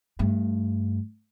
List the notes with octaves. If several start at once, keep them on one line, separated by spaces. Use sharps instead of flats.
G2 A3